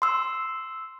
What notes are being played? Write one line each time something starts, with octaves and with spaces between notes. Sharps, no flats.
C6 E6